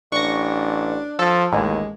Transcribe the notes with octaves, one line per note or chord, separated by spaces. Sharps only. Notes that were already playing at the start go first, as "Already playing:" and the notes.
A1 D4 C#6 A#6
F3 A4
A1 D#2 G#3